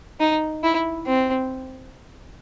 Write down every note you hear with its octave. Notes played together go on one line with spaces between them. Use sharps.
D#4
E4
C4